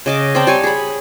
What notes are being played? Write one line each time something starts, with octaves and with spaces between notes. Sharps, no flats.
C#3 D#5 D6
C4 D5 G5 A5
G3 C#5 G#5 A5
G#4 B5